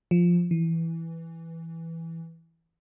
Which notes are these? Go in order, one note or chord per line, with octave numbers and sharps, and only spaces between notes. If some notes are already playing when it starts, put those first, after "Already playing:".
F3
E3